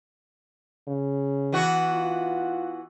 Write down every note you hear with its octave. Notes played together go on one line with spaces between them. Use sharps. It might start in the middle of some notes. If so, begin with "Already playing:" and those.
C#3
E3 B3 F#4
F4